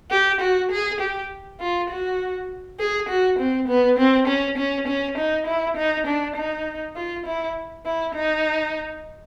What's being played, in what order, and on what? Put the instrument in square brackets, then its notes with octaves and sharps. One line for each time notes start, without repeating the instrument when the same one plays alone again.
[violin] G4
F#4
G#4
G4
F4
F#4
G#4
F#4
C4
B3
C4
C#4
C#4
C#4
D#4
E4
D#4
D4
D#4
F4
E4
E4
D#4